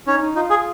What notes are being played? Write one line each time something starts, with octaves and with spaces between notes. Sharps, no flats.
C#4 D#4
D#4
D#4 F4
G#4